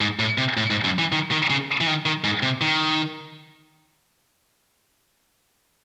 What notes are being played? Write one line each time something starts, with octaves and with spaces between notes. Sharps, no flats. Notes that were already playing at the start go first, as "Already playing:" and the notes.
G#2
A2
C3
A2
G#2
F#2
E3
D#3
D#3
C#3
E3
D#3
D#3
G#2
C3
D#3